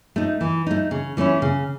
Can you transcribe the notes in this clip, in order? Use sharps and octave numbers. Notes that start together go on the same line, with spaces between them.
A3 D#4
E3
A3 D#4
C#3
E3 A3 C#4 E4
C#3